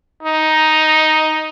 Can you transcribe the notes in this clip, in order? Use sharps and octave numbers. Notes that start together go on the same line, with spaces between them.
D#4